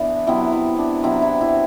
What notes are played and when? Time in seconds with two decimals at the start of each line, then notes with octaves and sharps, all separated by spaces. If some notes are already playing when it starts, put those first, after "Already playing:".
Already playing: E3 B3 D4 E4
0.27 C3 F#3 B3 E4
0.52 E4
0.78 D4
1.03 C3 F#3 B3 E4
1.22 E4
1.41 E4